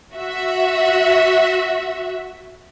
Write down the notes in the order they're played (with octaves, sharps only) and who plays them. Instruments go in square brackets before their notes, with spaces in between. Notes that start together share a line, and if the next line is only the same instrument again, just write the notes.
[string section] F#4 E5